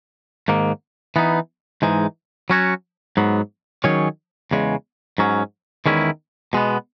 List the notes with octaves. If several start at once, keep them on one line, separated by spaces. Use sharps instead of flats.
G#2 D#3 A#3
E3 B3 D#4
G#2 E3 G#3 D#4
F#3 C#4 F#4 C#5
G#2 F#3 B3
D#3 F#3 C#4 G#4 C#5
E2 C#3 G#3
G#2 F#3 C#4
E2 D#3 G#3 C#4 E4
B2 G#3 B3